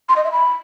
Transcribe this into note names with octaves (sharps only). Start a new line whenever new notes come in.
C6
D#5
E5
B5